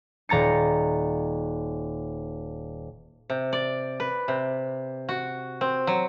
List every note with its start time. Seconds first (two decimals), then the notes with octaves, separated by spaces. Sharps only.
0.29 D#1 A#5 A6 C#7
3.30 C3
3.53 D5
4.00 B4
4.28 C3
5.09 F#4
5.61 C4
5.87 F#3